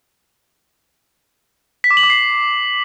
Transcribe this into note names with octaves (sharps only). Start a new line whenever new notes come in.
B6
D6
F#7
D6
C7